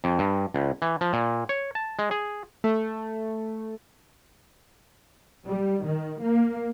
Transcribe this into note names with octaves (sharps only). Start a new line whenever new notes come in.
F2
G2
C#2
E3
F3
A#2
C#5
A5
G#3
G#4
A3
G3
D#3
A#3